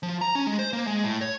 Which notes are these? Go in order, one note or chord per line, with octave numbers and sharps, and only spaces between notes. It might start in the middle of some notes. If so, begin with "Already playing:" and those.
F3
A#5
C#4
G#3
C5
A#3
G#3
A2
C#5